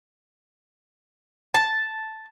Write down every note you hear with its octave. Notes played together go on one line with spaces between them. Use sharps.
A5